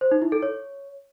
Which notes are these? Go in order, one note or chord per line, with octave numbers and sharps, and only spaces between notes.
C5
D#4
E4
A4
C#5